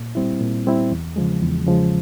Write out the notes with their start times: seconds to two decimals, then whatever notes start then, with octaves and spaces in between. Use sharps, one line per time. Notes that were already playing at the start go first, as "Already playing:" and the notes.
Already playing: A#2
0.15 G3 C4 E4
0.41 A#2
0.67 G3 C4 E4
0.91 E2
1.16 C#3 F3 G#3
1.42 E2
1.66 C#3 F3 G#3